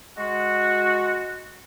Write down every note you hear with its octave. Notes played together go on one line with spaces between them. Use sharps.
G#3 F#4